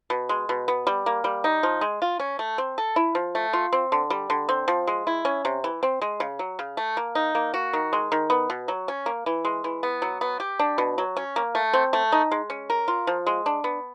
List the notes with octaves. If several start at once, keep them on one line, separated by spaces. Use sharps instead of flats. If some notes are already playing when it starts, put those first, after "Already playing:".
B2
G#3
B2
B3
G3
A#3
G3
D#4
F3
G#3
F4
C#4
A3
C4
A4
E4
F3
A3
F4
C4
D3
G3
D3
C4
F3
G#3
E4
C#4
C3
E3
C4
G#3
C#3
F#3
C#3
A3
A#3
D#4
A#3
F#4
D#3
G#3
D#3
B3
B2
F#3
C#4
A#3
E3
G#3
E3
B3
F#3
B3
G4
D4
B2
F#3
C#4
A#3
A3
C4
A3
D#4
G#3
C#4
A#4
F4
F3
G#3
D4
B3